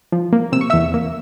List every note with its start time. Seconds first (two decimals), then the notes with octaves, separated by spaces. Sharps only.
0.12 F3
0.33 A#3
0.52 C3 E6
0.61 C#6
0.70 E2 E5 E6
0.94 A#3